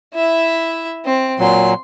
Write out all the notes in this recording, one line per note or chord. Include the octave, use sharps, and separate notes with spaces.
E4 E5
C4
A#2 F#3 C6